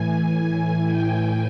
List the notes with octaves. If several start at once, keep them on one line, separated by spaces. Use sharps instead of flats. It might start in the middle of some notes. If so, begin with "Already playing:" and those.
Already playing: A2 E3 G#5
G5